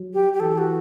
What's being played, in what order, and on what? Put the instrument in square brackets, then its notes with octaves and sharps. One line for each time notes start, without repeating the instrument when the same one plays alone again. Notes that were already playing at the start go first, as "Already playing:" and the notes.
Already playing: [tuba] F#3
[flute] G4
G4
[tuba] E3 [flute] A4
[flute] F#4